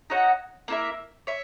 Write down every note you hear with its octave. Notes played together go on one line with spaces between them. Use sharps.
D#4 F#4 C#5 F#5
A#3 E4 A#4 E5
C#5 E5